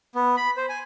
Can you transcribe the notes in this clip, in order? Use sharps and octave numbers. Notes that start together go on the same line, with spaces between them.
B3
B5
C5
G#5